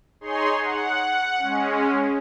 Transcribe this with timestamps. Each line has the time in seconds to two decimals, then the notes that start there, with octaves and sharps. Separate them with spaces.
0.21 D#4 G#4 C#5 C6
0.59 F#5
1.38 G#3 C#4